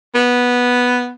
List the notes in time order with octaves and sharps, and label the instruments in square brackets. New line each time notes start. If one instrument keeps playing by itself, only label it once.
[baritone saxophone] B3